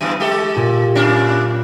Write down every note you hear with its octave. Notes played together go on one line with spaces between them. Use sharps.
F#2 E3 B3 C#7 D#7
G#3 G4 A4
A#2
F#2 C#4 D4